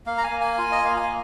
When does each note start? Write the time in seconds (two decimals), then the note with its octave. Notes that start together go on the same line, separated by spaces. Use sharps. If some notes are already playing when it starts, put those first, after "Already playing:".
0.06 A#3 F5
0.18 A#5
0.24 G#5
0.32 A#3
0.41 G#5
0.58 F4
0.72 D#5
0.84 A#3 F5
0.97 G#5